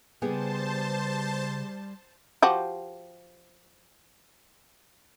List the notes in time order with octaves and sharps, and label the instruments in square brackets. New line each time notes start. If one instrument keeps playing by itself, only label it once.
[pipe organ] C#3 [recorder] G3 [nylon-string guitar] B3 G4 G#4 [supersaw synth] C5 A5
[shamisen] F3 F#4 G4